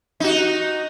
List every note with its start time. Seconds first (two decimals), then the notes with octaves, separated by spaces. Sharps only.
0.20 D#4 F#4